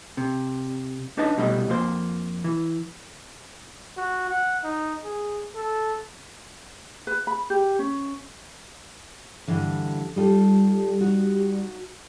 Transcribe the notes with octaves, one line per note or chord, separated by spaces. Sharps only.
C3
D4 D#4 B4 D#5 A5
C2 B2 G3 A3 D#5
F2 A#3 C5
E3
F#4
F#5
D#4
G#4
A4
B4
B5
G4
C#4
G2 D3 E3
G3 D#4 F4 A4
D#4 F#4